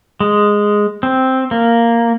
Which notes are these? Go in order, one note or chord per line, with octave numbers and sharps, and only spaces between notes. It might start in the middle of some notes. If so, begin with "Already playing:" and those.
G#3
C4
A#3